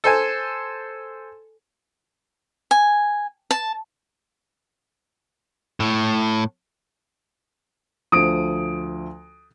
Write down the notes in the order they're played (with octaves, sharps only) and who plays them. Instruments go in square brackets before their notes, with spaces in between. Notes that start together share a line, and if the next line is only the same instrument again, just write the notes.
[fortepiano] A4 C5 G#5
[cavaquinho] G#5
A5
[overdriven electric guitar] A2
[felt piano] D2 F3 [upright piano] D#6 D7